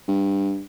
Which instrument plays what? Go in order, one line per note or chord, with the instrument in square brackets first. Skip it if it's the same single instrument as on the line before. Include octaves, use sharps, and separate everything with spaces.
[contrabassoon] G2